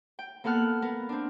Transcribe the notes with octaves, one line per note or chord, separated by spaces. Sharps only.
G5
A#3 B3 A4 F#5 F6 F#6
B3 A#4
C4 D4